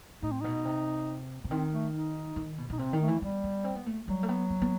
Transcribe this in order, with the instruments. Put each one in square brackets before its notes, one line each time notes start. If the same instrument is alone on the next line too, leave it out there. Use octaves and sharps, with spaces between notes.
[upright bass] A2 [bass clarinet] D#4
[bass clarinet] C4
[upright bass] B2 [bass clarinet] D#4
[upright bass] C3
C3
[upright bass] D#3 [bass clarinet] C4
[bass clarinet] A3
D#4
[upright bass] D#3
B2
[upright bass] B2 [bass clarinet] D#4
[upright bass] C3 [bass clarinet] C4
[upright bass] D#3
[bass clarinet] A3
[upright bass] E3
[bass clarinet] G3 [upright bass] B3
[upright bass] B3
C4
B3
A3
[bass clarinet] F#3 [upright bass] G3
[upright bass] A3
B3
B3
B3